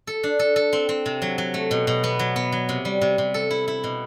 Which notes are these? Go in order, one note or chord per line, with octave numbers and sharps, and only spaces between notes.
A4
D4
A4
A4
C4
C4
C3
F#3
F#3
A3
B2
B2
B3
F#3
B3
F#3
C3
G3
C3
C3
A4
E4
E4
B2